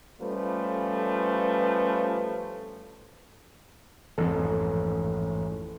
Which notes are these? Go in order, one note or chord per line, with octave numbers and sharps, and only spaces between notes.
F3 G3 A3 C#4 B4
A1 F2 G#2 F3 A4